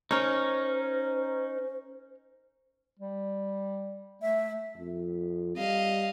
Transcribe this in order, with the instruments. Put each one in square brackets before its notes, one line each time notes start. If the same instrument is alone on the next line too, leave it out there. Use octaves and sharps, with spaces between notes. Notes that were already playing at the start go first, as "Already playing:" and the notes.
[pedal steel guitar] C#4 D#4 [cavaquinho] A#4 C#5 [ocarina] C5
[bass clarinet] G3
[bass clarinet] A3 [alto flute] E5
[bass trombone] F2
[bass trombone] G3 [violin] D#5 F5